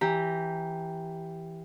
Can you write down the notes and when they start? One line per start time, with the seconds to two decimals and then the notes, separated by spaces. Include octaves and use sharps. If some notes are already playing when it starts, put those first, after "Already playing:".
0.01 E3 G4 A#5